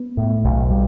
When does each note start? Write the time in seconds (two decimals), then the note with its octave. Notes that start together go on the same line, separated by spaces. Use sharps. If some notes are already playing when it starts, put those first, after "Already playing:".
Already playing: B3
0.17 A2
0.44 B1
0.70 G3